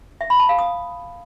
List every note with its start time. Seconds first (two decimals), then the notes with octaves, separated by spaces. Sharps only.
0.21 E5
0.30 B5
0.40 A5
0.49 F5
0.59 D#6